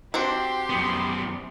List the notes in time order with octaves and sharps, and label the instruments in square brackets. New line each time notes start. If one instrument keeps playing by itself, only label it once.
[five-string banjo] C4 D4 F#4 [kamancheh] G4 C6
[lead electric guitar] F#2 B3